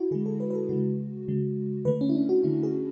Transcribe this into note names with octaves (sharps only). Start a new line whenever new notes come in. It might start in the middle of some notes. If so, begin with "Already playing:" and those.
Already playing: E4 F#4
D3 G#3 G#4
A4
B4
B4
A4
C#3 G#3 F#4
C#3 G#3
D3 A3 B4
C#4
E4
D4
F#4
D3 A3 E4
G#4